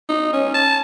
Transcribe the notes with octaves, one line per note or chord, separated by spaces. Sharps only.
D#4
C#4
A5